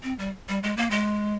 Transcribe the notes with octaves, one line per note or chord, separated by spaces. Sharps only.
C4
G3
G3
G#3
A#3
G#3